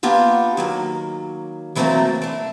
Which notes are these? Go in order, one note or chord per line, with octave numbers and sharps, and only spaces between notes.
A#3 B3 D4 F4 G4
D#3 F#3 A#3
E3 F#3 A3 A#3 C4 D4
A3 D4